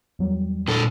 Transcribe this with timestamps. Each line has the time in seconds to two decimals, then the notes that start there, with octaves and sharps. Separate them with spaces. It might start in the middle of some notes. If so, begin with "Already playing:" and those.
0.19 E2 F#3 G3
0.68 A#2 D3 A4